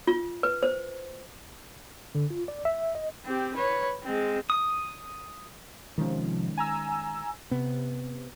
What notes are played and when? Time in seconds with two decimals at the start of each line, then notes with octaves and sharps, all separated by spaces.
0.07 F4
0.43 B4
0.63 C5
2.15 D3
2.30 F4
2.48 D5
2.65 E5
2.95 D#5
3.25 C4 G4
3.55 B4 C#5
4.04 G#3 C4
4.50 D#6
5.98 C3 D#3 F3 G#3 C#4
6.58 G#5 A#5 E6
7.51 C3 B3